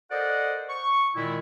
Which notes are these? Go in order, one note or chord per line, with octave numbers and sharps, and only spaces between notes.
A4 A#4 C5 D5 D#5 F#5
C#6
A#2 D#3 G#3 E4